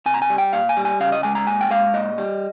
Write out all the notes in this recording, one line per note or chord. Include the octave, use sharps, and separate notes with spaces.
C3 G#5
A#5
G#5
G3
G5
A#2 F5
G#5
G3
G#5
C#3 F5
D#5
G#3 G#5
A#5
A#2 G#5
G5
G#3 F5
A#2 D#5
G3